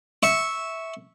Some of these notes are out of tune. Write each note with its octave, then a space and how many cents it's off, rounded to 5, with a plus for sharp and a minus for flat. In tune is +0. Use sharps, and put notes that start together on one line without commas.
E5 -10 C#6 +0